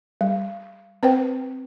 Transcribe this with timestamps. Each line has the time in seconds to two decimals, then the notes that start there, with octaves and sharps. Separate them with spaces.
0.21 G3
1.03 C4 B4 C5 G5